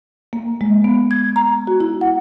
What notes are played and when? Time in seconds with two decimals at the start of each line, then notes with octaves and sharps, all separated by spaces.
0.33 A#3
0.61 G#3
0.84 B3
1.11 G#6
1.36 A#5
1.67 F#4
1.80 E4
2.01 F#5